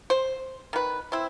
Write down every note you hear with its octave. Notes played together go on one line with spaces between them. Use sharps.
C5
D#3 B4
C4 E4